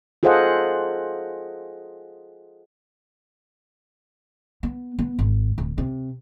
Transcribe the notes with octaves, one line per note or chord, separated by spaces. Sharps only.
F4 G#4 A4 C5 D#5 F#5
B3
B3
G#1
D1
C3